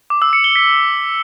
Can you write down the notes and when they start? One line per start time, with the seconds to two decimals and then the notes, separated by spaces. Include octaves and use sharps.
0.10 D6
0.22 E6
0.33 C#7
0.44 G7
0.56 B6